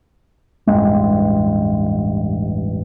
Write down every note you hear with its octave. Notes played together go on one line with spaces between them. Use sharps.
A1 E2 G2 G#3